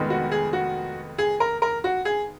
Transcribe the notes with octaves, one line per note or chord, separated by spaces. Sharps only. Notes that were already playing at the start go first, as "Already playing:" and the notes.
Already playing: F1 F2 D#3 G#3 B3
F#4
G#4
F#4
G#4
A#4
A#4
F#4
G#4